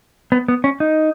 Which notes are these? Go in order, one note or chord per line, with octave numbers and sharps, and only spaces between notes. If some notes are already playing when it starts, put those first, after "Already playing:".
B3
B3
C#4
D#4